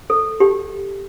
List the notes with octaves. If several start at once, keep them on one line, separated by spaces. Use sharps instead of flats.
A4
G4